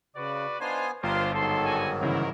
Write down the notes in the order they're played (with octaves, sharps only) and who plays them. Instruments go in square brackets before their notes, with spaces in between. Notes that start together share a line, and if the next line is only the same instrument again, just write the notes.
[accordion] C#3 [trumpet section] F#4 B4 D5
[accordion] B3 G#5 [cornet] D4 [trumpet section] D#4 F4 C5
[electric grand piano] G1 [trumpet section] D4 G4 C5 [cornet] F4 [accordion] A#4
[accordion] G#2 D#3 F#3 [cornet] A4 [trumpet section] C6
[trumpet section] G3 F#4 G#5
[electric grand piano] G1 C#3 E3 [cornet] A#3 [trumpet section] E4 A#4